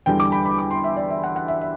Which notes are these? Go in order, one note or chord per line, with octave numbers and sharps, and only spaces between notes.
E2 D3 G3 G5
D6
B5
B5
D6
C6
E5
D5
E5
F#5
F#5
E5
E5